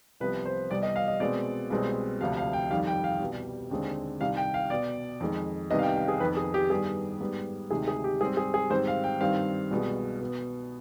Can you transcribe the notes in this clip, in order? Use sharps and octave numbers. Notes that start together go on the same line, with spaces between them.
C2 C3 F3 B3 B4
C5
C2 C3 G3 B3 D5
D#5
F5
D#5
B2 G#3 C4 D5
C2 B2 G#3 C4
D2 C3 F3 F5
F5
G5
F2 D#3 G3 F5
G5
F5
C2 B2 G3
D#2 D3 G#3 C4
C2 C3 D#3 F5
G5
F5
B2 B3 D5
F2 D#3 G#3
C2 C3 D#3 B3 D#5
F5
G5
F5
G#4
F2 D#3 B3 B4
G#4
G4
G2 D#3 G3 B3 G#4
G#2 G3 B3
D2 C3 D#3 G#3 G#4
G#4
G4
G#2 G3 C4 G#4
G#4
G#4
G#2 D#3 G3 C4 C5
F5
G5
G2 D#3 G3 C4 F5
C2 B2 G#3
B2
B3